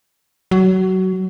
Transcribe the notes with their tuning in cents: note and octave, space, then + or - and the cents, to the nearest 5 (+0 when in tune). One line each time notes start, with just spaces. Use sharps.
F#3 +20